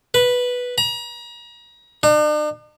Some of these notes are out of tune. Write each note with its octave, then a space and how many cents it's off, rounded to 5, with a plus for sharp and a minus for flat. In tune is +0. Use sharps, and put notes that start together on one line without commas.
B4 -5
A#5 +35
D4 +45